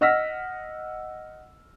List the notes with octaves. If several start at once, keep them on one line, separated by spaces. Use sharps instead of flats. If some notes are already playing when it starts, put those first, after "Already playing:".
D#5 F#5 E6 F6 A#6 B6